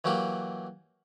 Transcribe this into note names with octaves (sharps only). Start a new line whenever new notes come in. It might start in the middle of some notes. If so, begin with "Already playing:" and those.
E3 F#3 A#3 G4